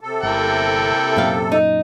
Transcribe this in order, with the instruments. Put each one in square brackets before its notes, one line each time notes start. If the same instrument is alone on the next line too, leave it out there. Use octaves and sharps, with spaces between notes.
[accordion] C3 A4
[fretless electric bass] G1 [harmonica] A#3 E4 G5
[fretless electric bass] F#2 A#2 [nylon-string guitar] E5 F5
[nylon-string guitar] D#4